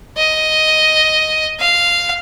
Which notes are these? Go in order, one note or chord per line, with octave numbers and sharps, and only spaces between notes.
D#5
F5